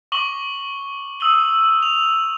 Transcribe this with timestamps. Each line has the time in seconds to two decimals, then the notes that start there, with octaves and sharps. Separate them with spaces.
0.12 C#6 D6 F#7 G7
1.20 D#6 E6 D#7 F#7 G7
1.82 F7